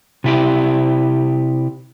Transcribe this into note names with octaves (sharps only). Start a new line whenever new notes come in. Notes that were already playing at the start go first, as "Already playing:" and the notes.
C3 E4 G4